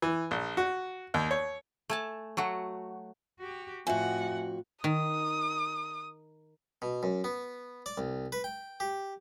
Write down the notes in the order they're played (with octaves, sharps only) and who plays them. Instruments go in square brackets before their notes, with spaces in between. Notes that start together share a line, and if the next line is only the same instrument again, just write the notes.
[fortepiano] E3
A#1
F#4
D#2
C#5
[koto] A3 G#5 A5
F#3 A3 F#4
[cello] F#4 G4
[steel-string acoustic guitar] F2 F#4 [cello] A2 F#5 [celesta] E5 G#5
[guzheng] D#3 [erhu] D#6
[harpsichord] B2
F#2
B3
D5
C2
B4
G5
G4